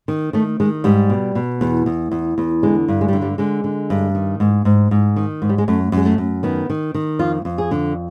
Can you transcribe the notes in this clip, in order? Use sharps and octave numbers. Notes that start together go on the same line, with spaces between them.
D#3
D#3 A3
D#3 G#3
G#2 G3
B2
B2
E2
E2
E2
E2
D3 G#3
G2
G#3
G3
D3
G3
D3 G#3
D3
G2
D#3
G#2
G#2
G#2
D#3
G#2
G3
G#3
F#2 A3
F#2 G#3
A3
F#2
D#3 B3
D#3
D#3
F2 F4
F2
G#4
D3